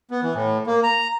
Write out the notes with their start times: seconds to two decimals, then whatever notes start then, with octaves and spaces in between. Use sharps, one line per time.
0.11 B3
0.23 E3
0.35 A2
0.67 A#3
0.83 A#5